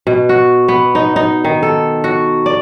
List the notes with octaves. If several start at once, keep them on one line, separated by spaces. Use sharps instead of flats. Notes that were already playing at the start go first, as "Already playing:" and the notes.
B2
F#4
B3
D#4
D#4
D#3
A4
F#4
D5